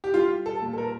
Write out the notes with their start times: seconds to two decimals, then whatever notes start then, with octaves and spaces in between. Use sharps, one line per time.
0.04 G4
0.14 G3 F4
0.46 A4
0.62 A#2
0.73 A4
0.78 A#4